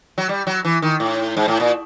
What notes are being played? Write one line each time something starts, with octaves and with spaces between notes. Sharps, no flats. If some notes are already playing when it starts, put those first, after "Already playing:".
F#3
G3
F#3
E3
D#3
A2
G#2
A2
A#2